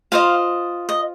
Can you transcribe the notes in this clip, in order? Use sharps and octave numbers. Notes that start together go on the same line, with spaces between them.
F4 C5 D#5 F5
D#5